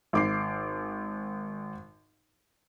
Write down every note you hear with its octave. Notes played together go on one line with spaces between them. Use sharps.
G#1 D6 C7